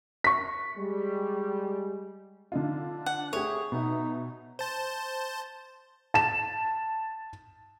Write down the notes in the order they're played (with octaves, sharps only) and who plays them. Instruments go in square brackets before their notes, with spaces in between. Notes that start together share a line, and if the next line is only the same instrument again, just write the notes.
[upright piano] C#6 B6
[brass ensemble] G3 G#3
[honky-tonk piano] D3 D#4 F4 [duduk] D4
[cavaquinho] F#5
[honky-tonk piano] A3 G4 [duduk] G#4 [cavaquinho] C#5
[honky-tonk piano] B2 E5 [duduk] D#4
[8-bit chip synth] C5 A5
[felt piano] A5 E7